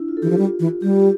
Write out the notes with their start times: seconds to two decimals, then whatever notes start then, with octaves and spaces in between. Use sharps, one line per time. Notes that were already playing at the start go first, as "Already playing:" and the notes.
Already playing: D4 E4
0.08 F4
0.17 A4
0.22 E3 G4
0.30 F3
0.38 G3 F4
0.60 E3
0.82 G3 G4